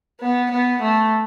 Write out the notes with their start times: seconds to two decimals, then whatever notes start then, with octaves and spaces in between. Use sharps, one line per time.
0.20 B3
0.51 B3
0.82 A3